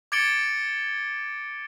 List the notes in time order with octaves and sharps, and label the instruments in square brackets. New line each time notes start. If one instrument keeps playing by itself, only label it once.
[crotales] D6 G#6 A6 C#7 D7 G7